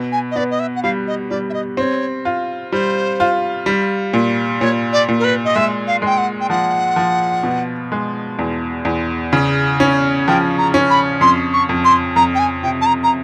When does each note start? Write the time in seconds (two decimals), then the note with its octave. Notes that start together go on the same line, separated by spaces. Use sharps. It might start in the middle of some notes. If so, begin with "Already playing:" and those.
Already playing: B2
0.12 G#5
0.31 D#5
0.36 B3 D5
0.51 D#5
0.60 E5
0.76 F#5
0.83 G3 F5
1.07 D#5
1.30 G3 D5
1.50 E5
1.54 D#5
1.77 C4 C#5
2.25 F4
2.72 G3 C5
3.20 F4
3.66 G3
4.14 A#2
4.61 A#2 C#5
4.93 D5
5.09 A#2
5.20 A#4
5.24 B4
5.45 D#5
5.55 G#3 E5
5.87 F5
6.02 G#3 G5
6.18 F#5
6.40 G5
6.50 F3 F#5
6.96 F3
7.43 B2
7.92 G#3
8.39 E2
8.85 E2
9.33 C#3
9.80 C#4
10.27 F3 G5
10.58 A#5
10.74 C#4
10.90 B5
11.21 F2 C6
11.53 C#6
11.69 F2
11.85 C6
12.16 F2 A#5
12.35 G5
12.39 G#5
12.63 C3 G5
12.81 A5
12.86 A#5
13.03 A#5